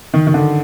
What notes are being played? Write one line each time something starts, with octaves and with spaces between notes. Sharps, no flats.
D#3
D#3
D3